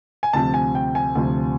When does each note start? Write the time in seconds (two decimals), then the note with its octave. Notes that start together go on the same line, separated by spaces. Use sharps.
0.23 G#5
0.33 D2 C3 F3 A5
0.54 G#5
0.75 G5
0.95 G#5
1.15 D2 C3 F3